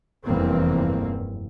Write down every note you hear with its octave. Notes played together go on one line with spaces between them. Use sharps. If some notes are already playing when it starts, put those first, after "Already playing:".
F1 E2 G2 E3 A#3 C4